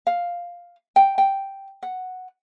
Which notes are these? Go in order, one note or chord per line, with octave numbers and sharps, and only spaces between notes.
F5
G5
G5
F#5